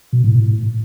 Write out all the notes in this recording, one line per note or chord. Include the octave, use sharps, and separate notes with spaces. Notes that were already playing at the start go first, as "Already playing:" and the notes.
B2
A2
A2